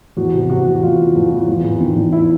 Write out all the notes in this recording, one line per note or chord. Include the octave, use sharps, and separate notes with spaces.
E2 F#4
C3
C3 F#4
E2
E2 F4
E3
E2
E3
E2
E2
D#3
E2
E4